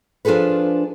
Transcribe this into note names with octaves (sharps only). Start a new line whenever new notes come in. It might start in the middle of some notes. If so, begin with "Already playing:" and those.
F3 D4 F4 G#4 A4 B4